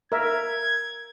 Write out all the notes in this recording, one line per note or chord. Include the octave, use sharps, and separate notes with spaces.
A#4 E5 G#6